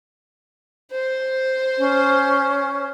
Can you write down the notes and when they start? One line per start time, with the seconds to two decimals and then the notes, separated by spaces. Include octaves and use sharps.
0.91 C5
1.78 C#4